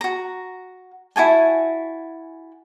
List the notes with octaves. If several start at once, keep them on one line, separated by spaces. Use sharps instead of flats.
F#4 A#5
E4 F#4 G#5 A5